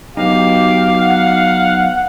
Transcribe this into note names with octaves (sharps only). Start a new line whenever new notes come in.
F#3 B3 D#4 G4 F5
F#5